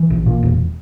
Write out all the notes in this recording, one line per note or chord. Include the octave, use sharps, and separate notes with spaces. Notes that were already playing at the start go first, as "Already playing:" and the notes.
Already playing: E3
A#1
A#2
E1